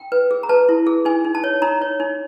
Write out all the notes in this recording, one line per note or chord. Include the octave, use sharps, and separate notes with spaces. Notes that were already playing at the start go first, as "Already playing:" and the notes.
Already playing: G5
B4
G#4
A#5
B4 A5
E4
G#4
D#4 G#5
D#4
A5
C#5
D#4 A#5
C#5
D#4